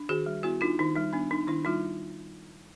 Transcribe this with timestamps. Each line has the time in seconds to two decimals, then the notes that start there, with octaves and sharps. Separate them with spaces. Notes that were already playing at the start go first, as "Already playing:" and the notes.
Already playing: D4
0.09 D#3 F#4 G#4
0.26 G3
0.43 B3 E4 F#4
0.61 D4 D#4 F4
0.79 D#3 D#4
0.95 G3 D#4
1.13 B3 D4
1.31 D4 D#4
1.47 D#3 D4 E4
1.65 G3 D#4 F4